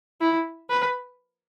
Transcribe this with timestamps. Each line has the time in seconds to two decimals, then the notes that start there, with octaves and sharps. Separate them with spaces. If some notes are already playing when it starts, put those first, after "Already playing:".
0.21 E4
0.70 B4